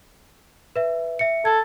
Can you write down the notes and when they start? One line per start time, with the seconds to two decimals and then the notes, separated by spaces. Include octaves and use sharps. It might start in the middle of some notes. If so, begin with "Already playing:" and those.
0.76 B4 E5
1.19 E5 C#7
1.45 A4 G#6